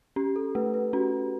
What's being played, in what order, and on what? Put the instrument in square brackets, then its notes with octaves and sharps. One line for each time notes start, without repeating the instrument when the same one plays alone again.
[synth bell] C#4 [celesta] G4
[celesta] A4
[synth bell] A3 [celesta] B4
[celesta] B4
[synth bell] C#4 [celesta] F#4